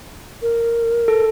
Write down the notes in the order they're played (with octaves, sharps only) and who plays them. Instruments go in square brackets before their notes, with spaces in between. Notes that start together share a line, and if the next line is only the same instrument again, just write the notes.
[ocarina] A#4
[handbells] A4